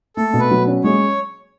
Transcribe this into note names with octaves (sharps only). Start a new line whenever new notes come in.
A3 A4
B2
B4
F#3
C#4
G#3 C#5